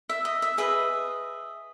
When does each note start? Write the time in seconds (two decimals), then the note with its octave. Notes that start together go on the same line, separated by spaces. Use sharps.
0.09 E5
0.25 D#5
0.42 E5
0.58 G#4 B4 D#5 E5